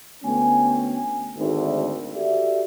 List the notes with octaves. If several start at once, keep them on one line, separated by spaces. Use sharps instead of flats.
D2 A3 B3 C#4 G5 G#5
G#1 D2
F#4 G4 A4 D5 E5